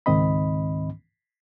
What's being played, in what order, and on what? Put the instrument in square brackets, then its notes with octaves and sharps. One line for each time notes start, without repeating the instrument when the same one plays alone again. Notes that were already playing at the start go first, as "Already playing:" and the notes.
[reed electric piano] C#2 G#2 D#3 C4 D#5 B5